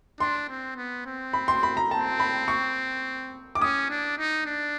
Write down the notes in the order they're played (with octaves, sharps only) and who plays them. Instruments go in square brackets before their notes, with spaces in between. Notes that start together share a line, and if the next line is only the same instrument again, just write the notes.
[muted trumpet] D4 [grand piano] C6
[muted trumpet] C4
B3
C4
[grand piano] B5
C6
B5
A#5
[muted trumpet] C4 [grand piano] A5
[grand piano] B5
C#6
D6
[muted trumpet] C#4 [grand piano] D#6
[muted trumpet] D4
D#4
D4